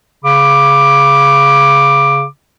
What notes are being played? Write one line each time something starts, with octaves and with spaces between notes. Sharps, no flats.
C#3 B5 D6